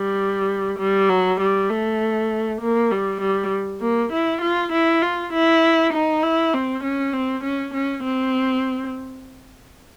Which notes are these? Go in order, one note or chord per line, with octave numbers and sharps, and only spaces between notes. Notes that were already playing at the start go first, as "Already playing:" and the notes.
Already playing: G3
G3
F#3
G3
A3
A#3
G3
G3
A#3
E4
F4
E4
F4
E4
D#4
E4
C4
C#4
C4
C#4
C#4
C4